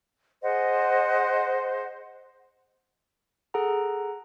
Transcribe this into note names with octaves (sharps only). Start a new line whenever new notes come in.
G#4 C5 D#5 F#5
G#4 A4 F#5 A#5